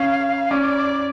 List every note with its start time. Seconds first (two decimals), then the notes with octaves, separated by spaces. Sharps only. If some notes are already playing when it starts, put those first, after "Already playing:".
Already playing: C#4 F5
0.51 C#4 D5